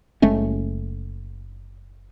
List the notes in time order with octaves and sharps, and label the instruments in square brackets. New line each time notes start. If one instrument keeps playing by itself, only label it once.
[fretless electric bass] F#1 G#3 A3 C#4